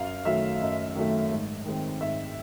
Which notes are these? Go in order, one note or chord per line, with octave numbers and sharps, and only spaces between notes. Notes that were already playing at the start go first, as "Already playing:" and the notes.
Already playing: F#2 F5
D#3 F#3 A3 E5
F#2 D#5
D#3 F#3 A3
G#2
D#3 G#3 C4
G#2 E5